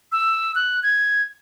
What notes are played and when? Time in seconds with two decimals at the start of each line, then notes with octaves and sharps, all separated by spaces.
0.12 E6
0.55 F#6
0.83 G#6